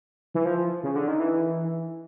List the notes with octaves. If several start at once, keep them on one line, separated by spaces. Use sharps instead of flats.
E3
F3
C#3
D3
D#3
E3